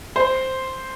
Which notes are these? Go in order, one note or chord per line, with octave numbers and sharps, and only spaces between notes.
C5